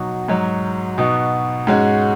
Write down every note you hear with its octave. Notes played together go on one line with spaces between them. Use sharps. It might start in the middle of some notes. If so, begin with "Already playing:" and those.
Already playing: B2 F#3 D#4 F#4
G#2 F#3 D#4 F#4
B2 B3 D#4 F#4
G#2 G#3 C#4 F#4